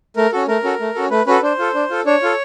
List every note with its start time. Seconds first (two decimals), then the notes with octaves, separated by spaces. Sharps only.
0.16 A3 A#4
0.32 C#4 F#4 A4
0.48 A3 A#4
0.64 C#4 F#4 A4
0.80 A3
0.95 C#4 F#4 A4
1.11 A3 B4
1.27 C#4 F#4 A4 B4
1.42 D4 C5
1.59 F4 A4
1.74 D4
1.91 F4 A4
2.06 D4 C#5
2.22 F4 A4